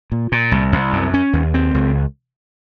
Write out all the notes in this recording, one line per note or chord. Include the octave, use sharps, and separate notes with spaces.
A#2
A#2
C2
C2
F#2
C#4
D#2
C4
C#2